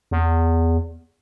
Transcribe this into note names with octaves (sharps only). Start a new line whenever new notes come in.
E2